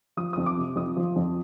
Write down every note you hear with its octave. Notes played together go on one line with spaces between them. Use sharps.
F3 D#6
D#6
F2
D6
C3
F2 D#6
F3
F2